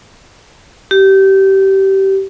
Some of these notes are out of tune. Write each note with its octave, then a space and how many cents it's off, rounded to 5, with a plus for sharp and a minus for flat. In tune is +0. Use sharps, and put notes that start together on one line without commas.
G4 -25